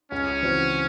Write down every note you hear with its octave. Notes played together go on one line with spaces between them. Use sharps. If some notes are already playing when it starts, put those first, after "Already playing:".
C#2 C#4
C#3 E3 C4 F#4